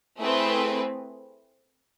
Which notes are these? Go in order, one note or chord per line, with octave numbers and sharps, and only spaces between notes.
A3 C4 E4 G#4 B4